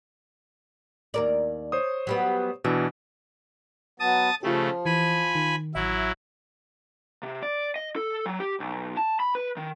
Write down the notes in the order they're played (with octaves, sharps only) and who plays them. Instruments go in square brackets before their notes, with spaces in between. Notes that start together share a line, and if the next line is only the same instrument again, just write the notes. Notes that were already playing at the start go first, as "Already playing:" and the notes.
[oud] D#2 A#4 D5
[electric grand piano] C5 C#5 D#6
[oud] F#3 G3 B3
[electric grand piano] B2 E3 D4 [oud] E5
[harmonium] F#3 B3 [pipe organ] A5 D#6
[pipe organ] C#3 A3 [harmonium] F3 [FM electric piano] F4 G4
[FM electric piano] E3 [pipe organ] G#5 B5
[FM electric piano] D#3
[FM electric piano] A1 E5 [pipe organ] F#3 E4
[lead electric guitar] C3
D5
D#5
A4
F#3
G4
B1
A5
B5
B4
D#3